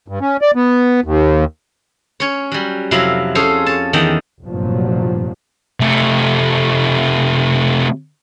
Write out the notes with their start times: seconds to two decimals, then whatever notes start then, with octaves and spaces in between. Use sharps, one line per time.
0.08 G2
0.21 C#4
0.42 D5
0.55 B3
1.04 D#2
2.20 C#4 C#5
2.52 F#3 G3
2.91 F2 C3 F#3 E4 F5
3.35 C#4 G#4 A4 C5 F5
3.66 C#5 A5
3.93 E2 D#3 F#5 G5 A5 A#5
4.42 F1 G2 A#2 F3 F#3
5.80 C3 A3